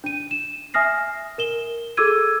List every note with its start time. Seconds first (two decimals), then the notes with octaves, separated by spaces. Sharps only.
0.04 D4 D#7
0.31 E7
0.74 E5 G#5 D#6 F6 A#6 C7
1.38 A#4 E7 G7
1.97 G#4 A4 D6 E6 G#6 D#7